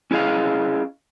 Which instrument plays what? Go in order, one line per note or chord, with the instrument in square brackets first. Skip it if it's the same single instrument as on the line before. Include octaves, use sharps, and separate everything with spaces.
[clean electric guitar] C#4 E4 G#4 D#5 F5